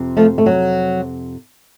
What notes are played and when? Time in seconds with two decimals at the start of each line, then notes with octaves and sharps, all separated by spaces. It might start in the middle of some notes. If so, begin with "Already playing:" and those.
Already playing: F2 C3
0.17 F3 A3
0.38 A3
0.46 F#3